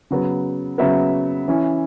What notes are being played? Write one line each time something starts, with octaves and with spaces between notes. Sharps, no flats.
C#3 F#3 B3
C#3 F#3 B3 E5
E3 C#4